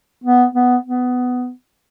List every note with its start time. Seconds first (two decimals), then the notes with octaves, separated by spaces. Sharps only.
0.24 B3
0.55 B3
0.86 B3